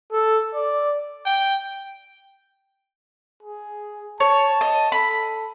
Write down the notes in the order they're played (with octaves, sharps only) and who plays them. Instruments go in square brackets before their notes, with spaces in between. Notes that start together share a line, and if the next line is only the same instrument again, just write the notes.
[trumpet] A4
D5
[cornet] G5
G#4
[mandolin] C#5 [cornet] A5
[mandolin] D#5
[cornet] A4 [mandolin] B5